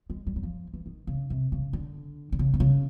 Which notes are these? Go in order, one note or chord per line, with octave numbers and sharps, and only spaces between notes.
G#3
G3
F#3
F3
E3
D#3
C#3
C3
C#3
D3
D3
C#3
C3
C#3